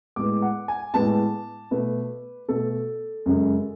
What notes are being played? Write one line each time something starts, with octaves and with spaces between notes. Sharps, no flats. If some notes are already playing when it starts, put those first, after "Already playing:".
A2 G#3 B3 D6
F#5
G#5
A2 G#3 B3 A5
B2 A3 B4
B2 A3 A4
F#2 C#3 G#3